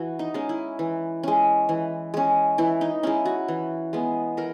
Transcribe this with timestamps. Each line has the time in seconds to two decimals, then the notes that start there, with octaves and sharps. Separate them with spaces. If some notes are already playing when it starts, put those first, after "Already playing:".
Already playing: E3 F#4
0.19 D#4
0.34 G#3 C#4
0.49 E4
0.79 E3
1.23 G#3 C#4
1.69 E3
2.14 G#3 C#4
2.58 E3 E4
2.81 D#4
3.03 G#3 C#4 E4
3.25 F#4
3.48 E3
3.93 G#3 B3
4.37 E3 A#4